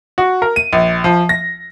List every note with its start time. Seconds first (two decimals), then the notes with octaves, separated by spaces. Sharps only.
0.18 F#4
0.42 A#4
0.56 D#7
0.73 A#1
1.04 F3
1.29 A#6